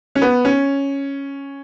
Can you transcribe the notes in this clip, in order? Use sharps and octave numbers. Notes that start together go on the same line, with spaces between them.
C#4
B3
C#4